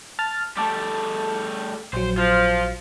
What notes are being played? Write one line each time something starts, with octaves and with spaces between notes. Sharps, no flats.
A5 F6 A6
G3 A3 A5 D6
A#1 F#3 C5
F3 F4